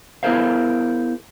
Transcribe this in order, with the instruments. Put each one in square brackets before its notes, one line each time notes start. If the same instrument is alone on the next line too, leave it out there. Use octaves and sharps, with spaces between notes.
[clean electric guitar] B3 E4 G#4 A#4 C5 F5